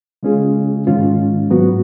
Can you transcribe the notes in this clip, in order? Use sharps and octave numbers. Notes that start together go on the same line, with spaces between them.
C#3 G#3 C#4 F4 G#4
G#2 D#3 G#3 C#4 F4
G#2 F#3 B3 F#4